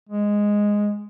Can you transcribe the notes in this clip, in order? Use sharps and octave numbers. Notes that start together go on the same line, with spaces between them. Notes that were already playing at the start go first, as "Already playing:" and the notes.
G#3